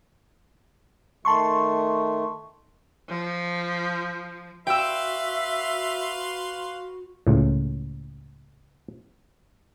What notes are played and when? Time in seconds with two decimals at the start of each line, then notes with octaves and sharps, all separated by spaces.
1.25 D#3 A3 A5 C6 C#6
3.08 F3
4.67 F#4 B4 E5 F5 G5 C6 E6
7.27 C#2 A2